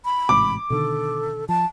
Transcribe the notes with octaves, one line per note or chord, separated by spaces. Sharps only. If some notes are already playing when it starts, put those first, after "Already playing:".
B5
A1 G#2 C3 D6
B2 D3 D#3 A4
F3 A5